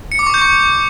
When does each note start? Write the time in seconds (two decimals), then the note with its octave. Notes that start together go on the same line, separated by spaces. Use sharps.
0.12 C#7
0.19 D6
0.27 C#6
0.34 G6
0.41 C#6